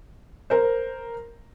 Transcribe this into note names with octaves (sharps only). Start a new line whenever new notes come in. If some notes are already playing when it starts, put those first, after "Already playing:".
A#4 C5